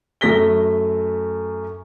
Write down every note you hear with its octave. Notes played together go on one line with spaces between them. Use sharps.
F#2 A3 A#6 B6 G7